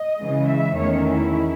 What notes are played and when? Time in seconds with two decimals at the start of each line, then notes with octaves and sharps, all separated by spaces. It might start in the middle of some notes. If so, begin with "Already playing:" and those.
Already playing: D#5
0.19 C#3 E3 G#3
0.49 E5
0.77 E2 D#3 A3 C#4 C#5
1.07 E4